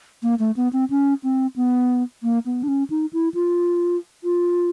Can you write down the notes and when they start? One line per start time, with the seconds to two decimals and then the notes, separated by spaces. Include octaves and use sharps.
0.23 A#3
0.39 A3
0.57 B3
0.73 C4
0.90 C#4
1.23 C4
1.56 B3
2.23 A#3
2.46 B3
2.63 D4
2.68 C#4
2.90 D#4
3.13 E4
3.34 F4
4.24 F4